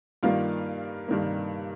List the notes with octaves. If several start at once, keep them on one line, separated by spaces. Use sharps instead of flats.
G2 D#3 G3 A#3 F4 F5
G2 D#3 G3 A#3